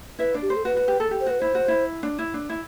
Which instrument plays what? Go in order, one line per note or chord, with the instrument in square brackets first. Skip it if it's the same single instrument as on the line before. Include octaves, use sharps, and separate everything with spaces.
[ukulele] E4 E5 [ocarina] B4
[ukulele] D4 D5
[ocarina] G4
[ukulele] C5
[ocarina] A4
[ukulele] F#4 [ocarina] B4
[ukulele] F#4
G4
A4
G4
[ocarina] C5
[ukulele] F#4 [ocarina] B4
[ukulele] E4 [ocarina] C5
[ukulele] F#4
E4
D4
E4
D4
E4